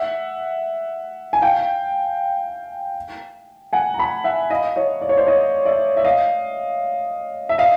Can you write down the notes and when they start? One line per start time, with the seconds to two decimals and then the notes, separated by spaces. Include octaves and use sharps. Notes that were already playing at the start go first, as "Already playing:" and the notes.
Already playing: E5 F#5
1.33 G#5
1.41 F5 G5
3.73 F#5 G#5
3.94 A#5
3.98 A5 B5
4.24 E5 F#5
4.50 D#5 F5
4.76 C#5 D#5
5.02 D5
5.09 C#5
5.17 C5 D5
5.27 C#5 D#5
5.65 D5 E5
5.97 E5
6.04 D#5 F5
7.49 E5
7.58 D#5 F5